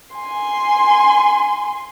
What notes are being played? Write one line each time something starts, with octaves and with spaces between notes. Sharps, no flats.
G#5 C6